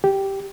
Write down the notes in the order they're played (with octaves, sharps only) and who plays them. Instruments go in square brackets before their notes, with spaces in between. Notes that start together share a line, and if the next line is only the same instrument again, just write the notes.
[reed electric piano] G4